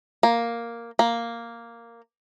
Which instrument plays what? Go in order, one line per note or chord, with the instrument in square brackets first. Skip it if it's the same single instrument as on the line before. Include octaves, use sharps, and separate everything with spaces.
[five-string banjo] A#3
A#3